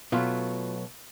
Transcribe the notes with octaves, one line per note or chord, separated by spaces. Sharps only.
B2 F#3 A3 F4